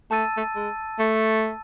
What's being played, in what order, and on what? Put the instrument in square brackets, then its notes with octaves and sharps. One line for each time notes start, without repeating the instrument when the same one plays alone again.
[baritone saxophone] A3 [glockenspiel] A5 E6 A6 D#7
[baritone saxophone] A3
G#3
A3